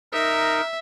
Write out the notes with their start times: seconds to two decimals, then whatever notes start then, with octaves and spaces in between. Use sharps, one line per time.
0.13 D#4 A#4 E5